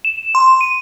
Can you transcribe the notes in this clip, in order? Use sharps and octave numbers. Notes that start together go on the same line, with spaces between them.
E7
C6
D#7